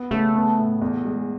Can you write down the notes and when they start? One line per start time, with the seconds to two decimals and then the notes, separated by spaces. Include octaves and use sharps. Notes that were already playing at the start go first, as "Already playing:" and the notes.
Already playing: B3
0.11 C#3 A3
0.35 B3
0.58 A2
0.82 E2
1.05 G#3